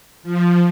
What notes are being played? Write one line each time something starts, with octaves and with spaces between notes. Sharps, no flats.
F3